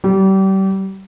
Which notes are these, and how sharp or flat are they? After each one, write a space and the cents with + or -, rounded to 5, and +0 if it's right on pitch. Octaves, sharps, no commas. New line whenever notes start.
G3 -30 G4 -35